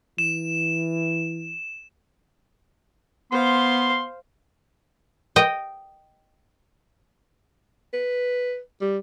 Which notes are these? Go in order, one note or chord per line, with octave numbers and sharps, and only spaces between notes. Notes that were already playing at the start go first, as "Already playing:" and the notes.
E3 E7
B3 C5 F5 C6
D#5 G5
B4
G3